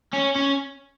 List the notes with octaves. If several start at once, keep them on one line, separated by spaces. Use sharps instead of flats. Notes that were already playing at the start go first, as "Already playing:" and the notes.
C#4
C#4